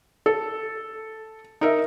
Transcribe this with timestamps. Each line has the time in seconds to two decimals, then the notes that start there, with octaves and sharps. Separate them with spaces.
0.26 A4
1.61 D#4 A#4 E5